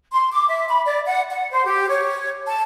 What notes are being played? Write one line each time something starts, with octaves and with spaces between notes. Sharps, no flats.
C6
D6
E5
B5
D5
F#5
F#5
C5
G4
C#5
A5